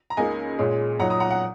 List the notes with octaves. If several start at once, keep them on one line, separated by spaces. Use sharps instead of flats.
A#5
C#2 C#3 A#3 D#4 D#5 G#5
A#2 G#3 C#4
A#2 F#3 D#4 F#5 A#5
A#5 D#6
F#5 A#5
F#5